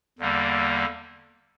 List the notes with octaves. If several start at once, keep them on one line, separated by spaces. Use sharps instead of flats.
E2 D3 G3 A#3